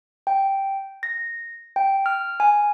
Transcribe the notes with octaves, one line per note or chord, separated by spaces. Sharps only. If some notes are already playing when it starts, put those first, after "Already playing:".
G5
A#6
G5
F6
G#5